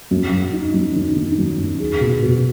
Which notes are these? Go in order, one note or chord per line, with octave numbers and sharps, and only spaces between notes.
F#2
F#2
D#4
F#2
D#3
D#3
F#2
F#2
G#4
B2
B2